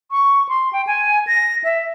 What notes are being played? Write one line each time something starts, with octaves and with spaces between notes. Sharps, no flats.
C#6
C6
G5
G#5
A#6
E5